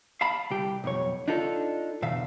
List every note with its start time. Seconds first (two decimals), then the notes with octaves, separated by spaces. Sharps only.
0.21 F5 A5 B5
0.50 C2 G4
0.84 B1 F2 C#5
1.28 D4 D#4 F4 A4
2.02 E2 B2 E5 F5